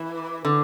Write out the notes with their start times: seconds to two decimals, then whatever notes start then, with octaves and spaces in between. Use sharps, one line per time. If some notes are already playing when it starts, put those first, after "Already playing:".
Already playing: E3
0.45 D3